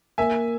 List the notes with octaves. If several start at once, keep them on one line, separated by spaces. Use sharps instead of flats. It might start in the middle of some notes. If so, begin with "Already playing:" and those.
A#3 E5 G#5